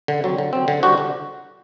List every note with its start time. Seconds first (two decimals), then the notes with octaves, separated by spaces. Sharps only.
0.08 D3
0.24 F#3 C4
0.38 D3
0.53 F#3 C4
0.68 D3
0.83 G3 D4 F#4 C5
0.98 D3